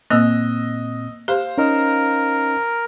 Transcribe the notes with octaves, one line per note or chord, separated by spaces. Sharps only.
A#2 A#3 C4 D#5 E6 F#6
G4 C5 F5
C#4 D#4 A#4 D#5